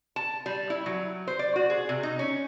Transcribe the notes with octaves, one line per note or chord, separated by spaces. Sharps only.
A5
G3
E4
F#3
C5
D5
F#4
G#4
C3
D#4
C#4